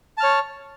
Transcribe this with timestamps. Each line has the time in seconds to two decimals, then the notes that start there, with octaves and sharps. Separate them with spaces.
0.18 A5
0.20 F6
0.23 C#5